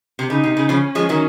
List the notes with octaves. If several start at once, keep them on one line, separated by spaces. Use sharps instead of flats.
C3
C#3 D#4
C3
C#3
C#3 F3 C#4
F3 G#3
D#3 F#3